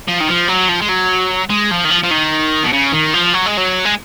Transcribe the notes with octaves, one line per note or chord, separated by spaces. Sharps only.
F3
D#3
F3
F#3
F3
G#3
F#3
G#3
F3
D#3
F3
F3
D#3
B2
C#3
D#3
F3
F#3
G#3
F#3
G#3